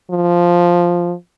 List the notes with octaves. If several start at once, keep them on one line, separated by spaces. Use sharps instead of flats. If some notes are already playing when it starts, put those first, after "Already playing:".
F3